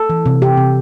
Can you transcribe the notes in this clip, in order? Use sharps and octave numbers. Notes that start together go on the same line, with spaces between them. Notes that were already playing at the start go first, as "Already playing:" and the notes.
Already playing: A4
E3
C3
C3 G4
C3